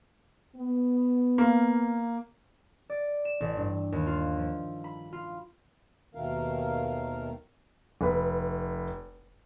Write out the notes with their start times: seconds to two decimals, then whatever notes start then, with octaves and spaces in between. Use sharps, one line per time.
0.56 B3
1.38 A#3
2.90 D5
3.25 E7
3.40 A1
3.57 G2
3.92 D#2
4.06 F4
4.37 F3
4.84 B5
5.13 F4
6.15 D#2 B2 D#3 A3 A#4 F5
8.01 F1 B4